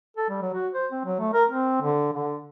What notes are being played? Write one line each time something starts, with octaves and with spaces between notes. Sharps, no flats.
A4
G3
F#3
F#4
C5
C4
F#3
A3
A#4
C4
D3
D3